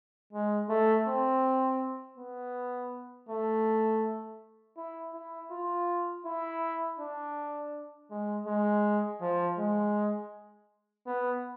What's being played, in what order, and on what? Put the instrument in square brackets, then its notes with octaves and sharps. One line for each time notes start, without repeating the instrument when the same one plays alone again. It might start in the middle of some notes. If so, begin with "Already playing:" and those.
[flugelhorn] G#3
A3
C4
B3
A3
E4
E4
F4
E4
D4
G#3
G#3
F3
G#3
B3